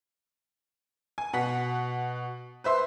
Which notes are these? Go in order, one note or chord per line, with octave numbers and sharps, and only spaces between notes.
G#5
B2 F#5 B6
B4 C5 E5 C6